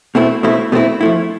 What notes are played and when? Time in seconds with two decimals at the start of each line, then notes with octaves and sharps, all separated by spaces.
0.15 B2 A3 C4 E4
0.43 B2 A3 C4 E4
0.72 B2 A3 C4 E4
1.01 F3 A3 E4